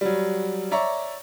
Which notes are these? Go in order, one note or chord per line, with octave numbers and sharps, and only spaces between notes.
F#3 G3
C#5 D5 E5 A#5 C#6